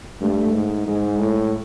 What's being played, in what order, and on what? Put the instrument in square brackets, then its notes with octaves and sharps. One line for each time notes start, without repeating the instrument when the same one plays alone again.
[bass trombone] G2 [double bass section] A3
[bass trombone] G#2
[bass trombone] G#2 [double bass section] G#3
[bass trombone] A2